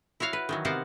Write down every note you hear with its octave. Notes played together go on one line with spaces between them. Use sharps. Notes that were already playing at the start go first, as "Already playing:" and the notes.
E4 F#4 C#5 F5
B4
D#3 E3 F#3
C3 B3 A#4 C5 F5 F#5